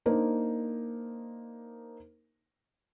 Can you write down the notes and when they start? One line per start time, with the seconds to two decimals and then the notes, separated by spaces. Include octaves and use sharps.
0.06 A#3 D4 D#4 A#4 C5